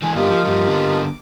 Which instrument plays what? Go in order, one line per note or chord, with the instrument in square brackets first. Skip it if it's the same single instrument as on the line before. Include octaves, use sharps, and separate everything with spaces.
[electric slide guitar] E3 G#3 [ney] G#5
[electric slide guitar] G2 B3 D4 [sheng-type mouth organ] A#3 D#4 F4 [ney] G4
[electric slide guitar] F3
[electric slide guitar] G2 F3 [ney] G4
[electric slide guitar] D3 B3
[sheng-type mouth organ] D6